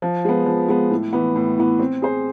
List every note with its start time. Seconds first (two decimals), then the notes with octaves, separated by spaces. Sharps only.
0.02 F3
0.25 G#3 B3
0.46 F3
0.68 G#3 B3
0.91 A2
1.13 E3 B3
1.36 A2
1.58 E3 B3
1.79 C4
2.02 G#4 C5